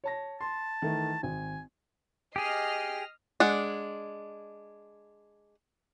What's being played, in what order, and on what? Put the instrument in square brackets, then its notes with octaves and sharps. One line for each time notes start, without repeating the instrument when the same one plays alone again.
[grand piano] C#5 A5 A#6
[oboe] A5 [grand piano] C6
[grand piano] D#3 E3 A3
[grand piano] G#1 [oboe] G#5
[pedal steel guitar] G4 G#4 [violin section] D#5 F6 C7
[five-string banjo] G#3 D4 F#5